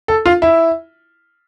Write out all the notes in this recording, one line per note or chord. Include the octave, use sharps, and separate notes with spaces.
A4
F4
E4